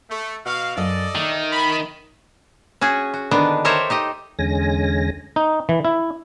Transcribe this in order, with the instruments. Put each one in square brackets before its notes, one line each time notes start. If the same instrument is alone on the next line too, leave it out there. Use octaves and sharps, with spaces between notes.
[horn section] A3
B2 F#4 F5
[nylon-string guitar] F#2 B4 F5 [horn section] A4 D5 D#5
[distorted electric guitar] D#3 [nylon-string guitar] A3
[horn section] B5
[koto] C#4 F#4 G#4
F#4
D3 D#3 B3 D4
G4 A4 A#4 C5 C#5 E5
D#4 G4 D#5
[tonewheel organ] E2 D3 G#3 C#4 G#5 A#6
[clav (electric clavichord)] D#4
E3
E4